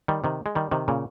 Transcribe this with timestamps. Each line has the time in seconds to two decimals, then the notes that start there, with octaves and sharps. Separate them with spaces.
0.08 D#3 G3
0.24 C3 D#3
0.46 G#3
0.55 D#3 G3
0.71 C3 D#3
0.88 A#2 C#3